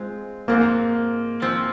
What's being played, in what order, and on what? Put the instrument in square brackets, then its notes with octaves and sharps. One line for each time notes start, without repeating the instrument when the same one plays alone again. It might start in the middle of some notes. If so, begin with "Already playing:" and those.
Already playing: [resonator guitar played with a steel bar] G#3 C4 F4
[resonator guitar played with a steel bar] G#2 F3 C4 [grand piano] A#3
[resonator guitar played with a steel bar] G#2 F3 C4